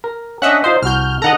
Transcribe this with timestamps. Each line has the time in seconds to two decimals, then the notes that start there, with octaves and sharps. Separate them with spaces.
0.04 A#4
0.42 C#4 D4 D#5 E5 F#5
0.64 D#4 F4 C5 D#5
0.83 C2 F#4 F6 G6
1.22 D#3 A4 D#5 F#5 A#5